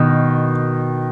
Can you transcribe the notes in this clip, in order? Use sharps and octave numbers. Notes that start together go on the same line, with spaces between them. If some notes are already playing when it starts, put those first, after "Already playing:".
Already playing: B2 D#3